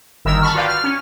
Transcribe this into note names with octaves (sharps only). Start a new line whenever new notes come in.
G1 D#3 A#4 E6
A5 B5 C#6 F6
F4 F#4 B4 D5 F5 G5
F6
C#4